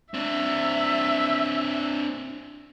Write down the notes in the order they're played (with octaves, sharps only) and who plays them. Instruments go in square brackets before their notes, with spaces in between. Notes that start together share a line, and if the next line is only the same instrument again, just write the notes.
[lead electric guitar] C4 D4 [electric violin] E5